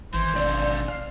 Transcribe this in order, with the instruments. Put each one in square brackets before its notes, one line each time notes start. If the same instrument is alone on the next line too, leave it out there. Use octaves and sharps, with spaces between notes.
[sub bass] G#1 [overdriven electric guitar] E3 [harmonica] C5
[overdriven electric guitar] B1 D3 [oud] C4 D5
[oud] F5